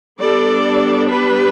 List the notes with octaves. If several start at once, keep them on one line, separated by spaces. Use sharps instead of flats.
G3 B3 D4 A4 D5
G4 B4